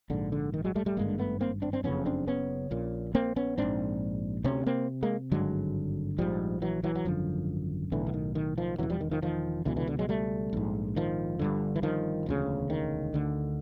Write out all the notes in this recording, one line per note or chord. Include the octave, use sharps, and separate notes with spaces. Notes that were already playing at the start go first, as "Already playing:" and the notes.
A#1 G#2 D3
D3
D#3
F#3 G#3
G3 A3
G3 A3
G#1 G2 D3 G#3 A#3
A3 B3
A#3 C4
C4 D4
C4 D4
F#1 F2 C#3 B3 C#4
C4 D4
B3 C#4
A#1 A#2
A#3 C4
B3 C#4
A#1 G#2 C4 D4
D2 C3 B3 C#4
A#3 C4
G#3 A#3
G#1 G2 D3 F#3 G#3
A#1 G#2 F3 G3
E3 F#3
E3 F#3
F#3
G#1 F#2 D3 F3
B1 A2 D3 E3
D3
D#3
D#3
D#3 F3
E1 E2 C#3 E3 F#3
F3 G3
D#3
D#3 F3
D#3 F3
C#2 B2 D3 E3
D3 E3
D3
F#3 G#3
G3 A3
A#1 G#2
D#3 F3
G1 G2 D3
E3
D#3 F3
E1 D2 C#3
D#3
D2 D3